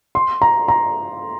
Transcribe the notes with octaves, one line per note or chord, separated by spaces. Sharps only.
C6
A#5
A#5